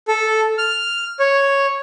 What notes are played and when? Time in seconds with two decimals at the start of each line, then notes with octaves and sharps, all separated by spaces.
0.08 A4
0.58 F6
1.19 C#5